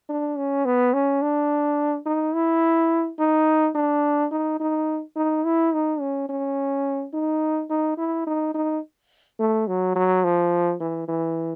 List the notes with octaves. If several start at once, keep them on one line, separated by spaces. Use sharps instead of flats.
D4
C#4
B3
C#4
D4
D#4
E4
D#4
D4
D#4
D#4
D#4
E4
D#4
C#4
C#4
D#4
D#4
E4
D#4
D#4
A3
F#3
F#3
F3
E3
E3